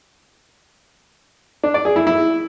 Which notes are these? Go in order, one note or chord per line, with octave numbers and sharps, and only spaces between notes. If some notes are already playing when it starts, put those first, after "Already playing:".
D4
D5
G#4
E4
E4